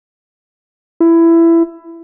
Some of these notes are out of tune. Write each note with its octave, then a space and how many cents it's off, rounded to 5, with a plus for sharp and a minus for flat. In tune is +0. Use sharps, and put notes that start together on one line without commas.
E4 +15